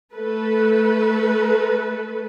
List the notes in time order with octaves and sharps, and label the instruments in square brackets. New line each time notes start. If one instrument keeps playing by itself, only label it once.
[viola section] A3 A4 B4